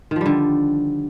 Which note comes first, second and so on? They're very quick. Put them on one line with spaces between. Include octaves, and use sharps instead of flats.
D#3 F3 G3 D3